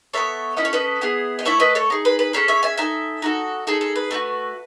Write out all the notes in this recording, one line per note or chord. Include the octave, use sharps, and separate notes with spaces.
B3 D#4 A4 C#5 E5
C#4 E4 A4 D#5
C#5
B4 D#5
B3 E4 G#4
D#5
A3 E4 A4 C#5 E5
B4 D#5
A4 C#5
D#4 G#4
B4
B4
C#4 E4 G#4 A4 C#5
C#5 E5
E5 G#5
D#4 A4 E5 G#5
D#4 F#4 A4
D#4 G#4 A4
A4
B4
A3 D#4 F#4